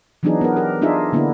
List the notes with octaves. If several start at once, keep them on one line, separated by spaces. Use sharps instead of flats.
E3 F#3 B3 D4 D#4 G#4
B3 A#4
G4 A#4
D4 D#4 F4 G#4 E5
D3 A#3 B3 D4 E4